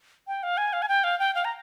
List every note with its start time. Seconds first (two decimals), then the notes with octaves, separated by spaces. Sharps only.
0.27 G5
0.43 F5
0.57 G#5
0.73 F5
0.82 G#5
0.89 G5
1.04 F5
1.19 G5
1.35 F5
1.45 A#5